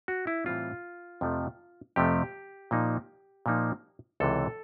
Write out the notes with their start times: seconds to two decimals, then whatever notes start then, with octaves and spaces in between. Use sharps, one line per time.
0.08 F#4
0.27 E4
0.46 A2 E3 G3 C4 F4
1.21 F2 C3 F3 A3
1.96 F2 C3 F3 A3 G4
2.71 A#2 F3 A#3 D#4
3.46 A#2 F3 A#3 D#4
4.20 C#2 C3 E3 A4